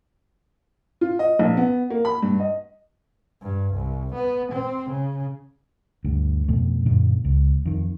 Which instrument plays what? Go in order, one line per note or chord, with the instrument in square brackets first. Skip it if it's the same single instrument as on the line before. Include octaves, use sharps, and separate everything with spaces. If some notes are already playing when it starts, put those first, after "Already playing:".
[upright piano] F4
D#5
A#1
B3
A#3
B5
G2
D#5
[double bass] G2
C2
B3
C4
C#3
[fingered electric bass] D2 G2
F2 B2 A3
F#2 A#2 D3
C#2
F2 D#3